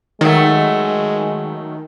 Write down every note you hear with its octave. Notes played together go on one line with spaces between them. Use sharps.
D#3 F#3 G#3 A3